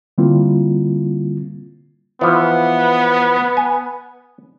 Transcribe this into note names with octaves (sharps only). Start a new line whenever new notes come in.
D3 G3 A#3 C4 E4 F4
E3 F3 B3
G#5